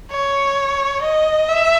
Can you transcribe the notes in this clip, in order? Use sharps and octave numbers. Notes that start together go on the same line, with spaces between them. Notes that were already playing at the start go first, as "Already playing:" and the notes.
C#5
D#5
E5